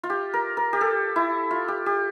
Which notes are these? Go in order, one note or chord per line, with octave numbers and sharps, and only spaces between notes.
F4
G4
A#4
A#4
G4
A4
E4
F4
G4
G4